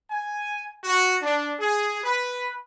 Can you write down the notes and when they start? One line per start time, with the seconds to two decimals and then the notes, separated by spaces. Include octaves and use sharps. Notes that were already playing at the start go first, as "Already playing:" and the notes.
0.11 G#5
0.84 F#4
1.22 D4
1.59 G#4
2.03 B4